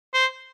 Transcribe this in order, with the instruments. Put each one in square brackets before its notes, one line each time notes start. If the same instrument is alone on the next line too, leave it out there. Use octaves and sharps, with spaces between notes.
[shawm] C5